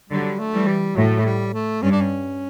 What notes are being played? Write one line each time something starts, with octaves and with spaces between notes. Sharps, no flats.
D3 F#3 G3
A3
E3 G3
G3
A2 F#3
A3
G3
A3
G2 C#4
D4
C#4